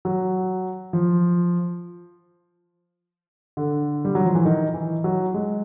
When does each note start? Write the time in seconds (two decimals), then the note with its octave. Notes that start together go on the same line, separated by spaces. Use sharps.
0.05 F#3
0.93 F3
3.57 D3
4.05 G3
4.15 F#3
4.25 F3
4.35 E3
4.45 D#3
4.74 E3
5.04 F#3
5.34 G#3